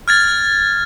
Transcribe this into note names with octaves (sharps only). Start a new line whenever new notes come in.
F6 G#6 A6